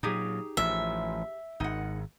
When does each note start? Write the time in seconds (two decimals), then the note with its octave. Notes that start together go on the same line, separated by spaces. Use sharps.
0.03 A#2 F#3 D#4 G4 G#4
0.57 A1 F3 E5
1.60 G#1 D#4 F#5